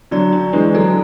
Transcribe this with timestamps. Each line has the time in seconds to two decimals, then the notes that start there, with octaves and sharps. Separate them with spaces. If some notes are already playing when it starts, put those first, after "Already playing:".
0.11 D3 F#3 D5
0.33 D4
0.53 E3 G#3 D4
0.74 D3 F#3 A4